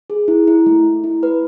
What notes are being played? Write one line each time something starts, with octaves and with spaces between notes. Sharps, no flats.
G#4
E4
E4
A3
A3
E4
B4